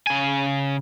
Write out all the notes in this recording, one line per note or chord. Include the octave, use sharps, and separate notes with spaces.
C#3 G#5